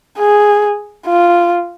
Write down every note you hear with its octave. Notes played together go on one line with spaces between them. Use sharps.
G#4
F4